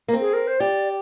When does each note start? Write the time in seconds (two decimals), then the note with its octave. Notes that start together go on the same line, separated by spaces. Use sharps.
0.08 A#3
0.13 C4
0.21 G#4
0.33 A#4
0.47 C5
0.60 G4 D5